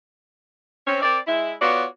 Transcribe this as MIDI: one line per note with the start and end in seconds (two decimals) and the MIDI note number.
0.87 1.01 60
0.87 1.01 61
1.02 1.17 60
1.02 1.17 70
1.02 1.17 74
1.27 1.54 56
1.27 1.54 64
1.61 1.85 59
1.61 1.85 65
1.61 1.85 66
1.61 1.85 73
1.61 1.85 74